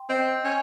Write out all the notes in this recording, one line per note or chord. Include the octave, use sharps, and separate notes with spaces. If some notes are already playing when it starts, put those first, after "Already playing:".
Already playing: G5 C6
C4 D#5
C#4